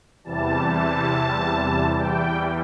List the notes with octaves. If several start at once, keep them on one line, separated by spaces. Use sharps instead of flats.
E2 C3 E3 G3 A5
A5
E2 E3 G3 G5